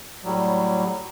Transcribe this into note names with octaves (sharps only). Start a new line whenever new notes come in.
A2 F#3 G3